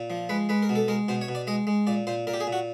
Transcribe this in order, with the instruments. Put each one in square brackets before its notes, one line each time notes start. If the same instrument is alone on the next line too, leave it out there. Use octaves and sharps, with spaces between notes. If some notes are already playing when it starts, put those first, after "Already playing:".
Already playing: [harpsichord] A#2
F3
G#3 B4
G#3 B4
A#4
B2
A4
G#3 A#4
B2 C5
C#5
B2
D5
G#3 D#5
G#3
A#2 D5
A#2 C5
A#2 A#4
G4
G#4
A#2
F#4